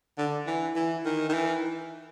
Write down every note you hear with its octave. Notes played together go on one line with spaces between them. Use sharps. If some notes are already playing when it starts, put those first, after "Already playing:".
D3
E3
E3
D#3
D#3
E3